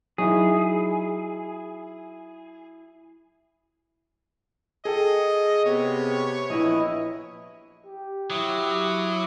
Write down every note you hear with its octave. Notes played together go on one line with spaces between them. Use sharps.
F#3 D#4 E4 G#4
G#4 A4 D#5 G5
C3 B3 C#5
A#1 E3 E4 D#5
G4
F#3 E4 D6 D#6